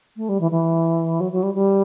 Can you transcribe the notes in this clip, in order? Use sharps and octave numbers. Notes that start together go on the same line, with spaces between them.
A3
G3
E3
E3
F#3
F#3
G3
G3